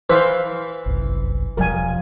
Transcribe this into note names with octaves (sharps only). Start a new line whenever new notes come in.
E3 B4 C5 E5 F5
G1 C2 F#2
E1 B2 F3 G3 A#4 G#5